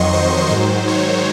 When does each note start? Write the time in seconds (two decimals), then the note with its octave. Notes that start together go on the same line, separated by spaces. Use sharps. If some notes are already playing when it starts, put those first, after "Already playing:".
Already playing: F2 D#3 F#3 D#5 C6 C#6
0.13 C5
0.50 G#2 D#3 F#3 C5
0.88 C#5